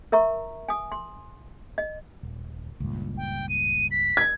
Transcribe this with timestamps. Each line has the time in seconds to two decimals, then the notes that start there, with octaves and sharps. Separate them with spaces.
0.12 A#4 E5 A#5 C#6
0.68 G#5 D#6
0.92 C6
1.78 D#5
2.23 D#1
2.80 C#2 G2 A#2
3.17 G5
3.49 D#7
3.91 B6
4.17 G#6